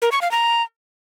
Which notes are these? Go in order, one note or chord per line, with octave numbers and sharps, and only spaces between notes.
A#4
C#6
F5
A#5